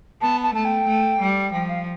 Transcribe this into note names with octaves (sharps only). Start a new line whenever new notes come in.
B3 A5
A5
A3 A5
G5
A3
G3
F3 G5
F5